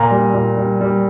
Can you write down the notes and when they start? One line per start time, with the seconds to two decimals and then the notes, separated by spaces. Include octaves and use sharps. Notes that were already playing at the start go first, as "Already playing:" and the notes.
Already playing: A#2 A#5
0.11 G3
0.34 A#2
0.57 G3
0.81 G3